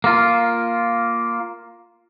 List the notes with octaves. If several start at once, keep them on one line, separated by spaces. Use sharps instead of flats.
A#3 F4